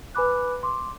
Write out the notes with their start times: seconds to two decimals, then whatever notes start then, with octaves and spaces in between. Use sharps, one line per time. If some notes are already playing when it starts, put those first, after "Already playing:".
0.15 B4 G#5 B5 D6 F#6
0.63 C6 D6